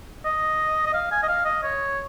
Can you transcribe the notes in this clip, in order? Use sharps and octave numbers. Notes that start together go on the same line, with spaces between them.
D#5
D#5
F5
G#5
D#5
F5
D#5
C#5